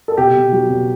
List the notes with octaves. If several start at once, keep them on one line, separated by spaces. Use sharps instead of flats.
A4
B2 G4
B2
F#3
B2